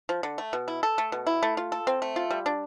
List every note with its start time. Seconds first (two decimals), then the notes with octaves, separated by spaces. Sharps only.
0.09 F3
0.23 D3
0.38 A3
0.53 B2
0.68 E4
0.83 A4
0.98 A3
1.12 B2
1.27 E4
1.43 A3
1.57 F4
1.72 A4
1.87 C4
2.02 A3
2.16 F4
2.30 G3
2.46 D4